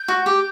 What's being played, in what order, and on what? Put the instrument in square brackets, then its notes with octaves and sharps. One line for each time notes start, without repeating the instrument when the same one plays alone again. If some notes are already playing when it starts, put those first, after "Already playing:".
Already playing: [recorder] G6
[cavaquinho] F#4
G4